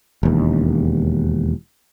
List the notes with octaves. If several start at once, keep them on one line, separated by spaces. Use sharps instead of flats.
E1 D#2